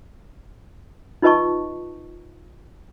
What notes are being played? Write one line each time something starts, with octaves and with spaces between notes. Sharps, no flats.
D#4 F4 B4 D#5 A5 C#6